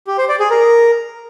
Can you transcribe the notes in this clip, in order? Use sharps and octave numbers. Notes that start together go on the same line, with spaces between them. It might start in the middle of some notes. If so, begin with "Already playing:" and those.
G4
C5
D5
G#4
A#4